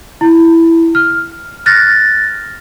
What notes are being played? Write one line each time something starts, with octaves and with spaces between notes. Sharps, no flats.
E4
F6
F6 F#6 A6 A#6